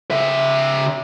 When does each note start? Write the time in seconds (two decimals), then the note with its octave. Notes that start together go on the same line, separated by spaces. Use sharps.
0.11 C#3 E5